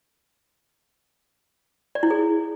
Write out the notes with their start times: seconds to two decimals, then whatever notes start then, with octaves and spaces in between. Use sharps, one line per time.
1.95 D5
2.03 E4
2.10 G#4